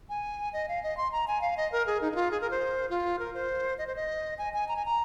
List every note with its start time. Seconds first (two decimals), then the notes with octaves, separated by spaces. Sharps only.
0.09 G#5
0.53 D#5
0.68 F5
0.83 D#5
0.97 C6
1.12 A#5
1.27 G#5
1.41 F5
1.57 D#5
1.72 A#4
1.87 G#4
2.01 D#4
2.12 D#4
2.15 F4
2.31 G#4
2.41 A#4
2.51 C5
2.90 F4
3.19 A#4
3.34 C5
3.78 D#5
3.87 C5
3.96 D#5
4.38 G#5
4.53 G#5
4.68 A#5
4.76 G#5
4.85 A#5